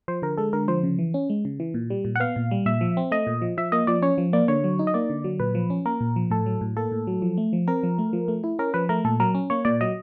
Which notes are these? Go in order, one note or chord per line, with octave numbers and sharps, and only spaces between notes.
F3 C5
D3 A#4
G#3 A4
D3 A#4
F3 C5
C#3
E3
C#4
G#3
C#3
E3
A#2
G3
A#2
F#5
B3 F5
A#2
G3
A#2 E5
F3
C4
A3 D#5
A#2
F3
F3 E5
A#3 D#5
F3 D5
C#4 C#5
F3
A#3 D5
D3 C#5
F#3
D#4
D#5
A#3 D5
D3
F#3
A#2 B4
F3
C#4
A#3 A#4
A#2
F3
A2 A4
F#3
A2
A#3 A4
A2
F#3
F3
A3
F3
C4 A#4
F3
A3
F3
A3
E4
C#4 A#4
F3 B4
A3 A#4
A#2 A4
F#3 A#4
C#4
A#3 C#5
A#2 D5
F#3 D#5